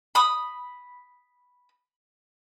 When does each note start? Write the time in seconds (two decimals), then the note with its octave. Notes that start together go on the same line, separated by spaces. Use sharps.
0.15 B5 D#6